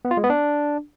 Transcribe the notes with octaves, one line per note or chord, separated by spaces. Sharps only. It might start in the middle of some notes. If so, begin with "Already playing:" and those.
B3
F4
G#3
B3
D4